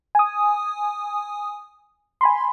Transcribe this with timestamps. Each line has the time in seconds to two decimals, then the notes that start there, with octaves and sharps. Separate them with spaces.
0.15 G#5 D#6
2.21 G#5 B5 C6